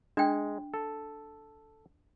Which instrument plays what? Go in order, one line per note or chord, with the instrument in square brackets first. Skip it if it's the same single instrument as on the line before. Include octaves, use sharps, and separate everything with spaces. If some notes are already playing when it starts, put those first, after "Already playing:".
[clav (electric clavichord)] G#3 [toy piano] D4 G5
[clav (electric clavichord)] A4